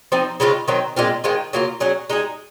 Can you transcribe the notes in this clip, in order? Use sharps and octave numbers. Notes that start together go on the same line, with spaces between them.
F3 C4 D#4
C#3 G#3 C4 F4
D#3 F#3 C4 D#4
A#2 G#3 C4 F4
D#3 G#3 C4 F4
C#3 F#3 A#3 F4
F#3 C#4 G#4
G#3 D#4 G#4